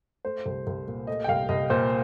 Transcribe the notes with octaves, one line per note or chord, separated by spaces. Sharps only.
A3 C5
C2
C2
A#2
A3 D#5
G5
C2 F5
C2 D#5
A#2 C5